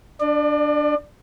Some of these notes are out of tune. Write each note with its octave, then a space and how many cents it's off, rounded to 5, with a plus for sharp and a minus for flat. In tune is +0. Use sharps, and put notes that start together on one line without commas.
D4 +0 D5 +35